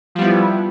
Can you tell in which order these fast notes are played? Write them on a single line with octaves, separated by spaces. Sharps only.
F3 G3 B3 E4